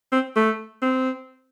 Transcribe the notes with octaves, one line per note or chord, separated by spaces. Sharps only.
C4
A3
C4